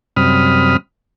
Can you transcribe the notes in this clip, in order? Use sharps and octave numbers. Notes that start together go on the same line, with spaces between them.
F#2 C3 G3 B5 D#6 F6